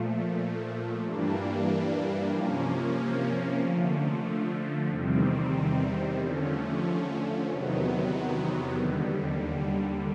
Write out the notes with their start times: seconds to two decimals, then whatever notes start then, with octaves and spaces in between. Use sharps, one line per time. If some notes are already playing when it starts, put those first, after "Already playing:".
Already playing: A#2 F3 A3
1.03 G2 E3 G3 A#3 D4
2.31 C3 F3 A#3 C#4
3.61 D3 F3 A3
4.89 E2 C3 D#3 G3 C4
6.18 D3 F3 A3 C#4
7.47 E2 C3 D#3 F#3 B3
8.75 D#2 D3 G3